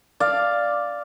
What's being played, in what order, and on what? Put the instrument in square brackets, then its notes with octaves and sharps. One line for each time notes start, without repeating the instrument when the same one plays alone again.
[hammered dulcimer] D5 F5